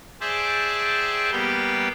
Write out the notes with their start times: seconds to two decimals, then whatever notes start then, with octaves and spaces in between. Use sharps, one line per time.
0.21 G#4 C5 D5 E5 G5 A5
1.32 G3 A#3 B3 G4 G5